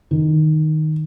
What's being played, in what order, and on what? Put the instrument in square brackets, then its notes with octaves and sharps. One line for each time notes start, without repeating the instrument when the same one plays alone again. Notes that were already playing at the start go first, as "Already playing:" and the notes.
[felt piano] D#3